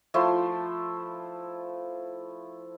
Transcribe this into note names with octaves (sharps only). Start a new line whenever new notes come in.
F3 A3 E4 C6